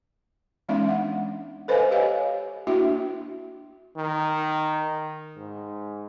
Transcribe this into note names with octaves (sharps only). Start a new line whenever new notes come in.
E3 G#3 B3 C#4 D#4 E5
D4 F#5
A4 B4 C5 D#5 F5 G#5
G4 B4 C#5 D#5 F5 G#5
A#3 D4 E4 F#4 E5
D#3
G#2